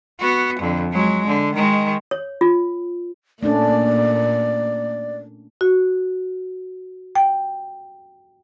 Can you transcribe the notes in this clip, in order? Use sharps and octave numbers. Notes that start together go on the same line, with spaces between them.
B3 F#4
F2 D3
F#3 G#3
D3
D#3 G#3
C#5
F4
A#2 A3 A#3 C#4 D4 D5
F#4
G5